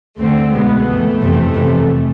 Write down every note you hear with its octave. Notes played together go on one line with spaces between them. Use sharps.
D2 D3 A3 C4
C2 B2 G#3 B3
F2 E3 A3
F2 C3 E3
F2 C3 E3